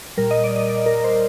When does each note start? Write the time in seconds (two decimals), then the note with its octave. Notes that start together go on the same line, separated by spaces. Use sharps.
0.17 A#2 G3 A#4
0.31 D#5
0.44 D5
0.56 D#5
0.70 D5
0.86 A#4
1.04 C5